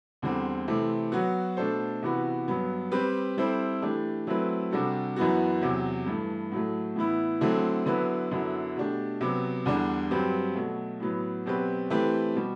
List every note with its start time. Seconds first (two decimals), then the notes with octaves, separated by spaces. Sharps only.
0.22 E2 D3 G3 C4
0.68 C3 E3 A3 C4
1.12 F#3 B3 F#4
1.57 B2 A3 D4 A4 C5
2.03 C3 E3 B3 F#4 B4
2.48 G2 F#3 B3
2.92 G3 C4 G4 B4
3.37 G3 C4 E4 A4 C5
3.82 E3 A3 D4 G4
4.27 F#3 A3 C4 E4 B4
4.71 C3 G3 D4 F#4 A4
5.16 F#2 E3 B3 F#4
5.61 E2 C3 F#3
6.06 G2 E3 A3
6.52 A2 F#3 A3
6.96 A2 E3 B3 E4
7.41 D3 F#3 A3 C4 E4
7.86 D3 F#3 B3 E4 B4
8.31 F#2 D3 F#3 B3 E4
8.76 B2 A3 D4 G4
9.21 C3 F#3 B3
9.66 E2 D3 G3 D4
10.11 G2 F#3 C4 G4 B4
10.55 B2 F#3 A3
11.00 A2 F#3 B3
11.46 B2 F#3 C4 G4 B4
11.90 E3 A3 C4 G4 B4
12.36 B2 G3